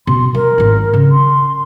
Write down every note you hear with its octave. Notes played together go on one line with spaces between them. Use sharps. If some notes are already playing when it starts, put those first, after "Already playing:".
B2 C6
F3 A#4
G#1 F4
C#3
C6